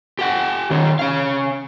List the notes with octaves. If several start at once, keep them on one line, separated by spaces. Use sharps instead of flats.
G4 F#5
D#3 C#4
C#4 F5